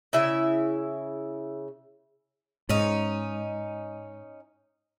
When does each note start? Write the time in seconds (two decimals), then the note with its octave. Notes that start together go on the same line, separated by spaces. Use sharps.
0.13 C#3 E4 E5
2.69 G#2 C#4 D#4